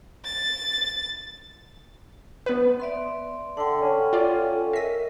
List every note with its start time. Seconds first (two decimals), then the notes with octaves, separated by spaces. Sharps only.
0.25 A6
2.46 B3 B4
2.80 D5 E5 C6
3.57 D3 A4 F#5 G5
3.82 C#4
4.13 F4 D5
4.73 A#4 D#5 E5 B6